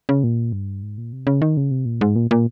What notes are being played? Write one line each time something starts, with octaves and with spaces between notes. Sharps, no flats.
C#3
A#2
G2
G#2
A#2
C3
C#3
D#3
C#3
C3
A#2
G#2
A#2
A#2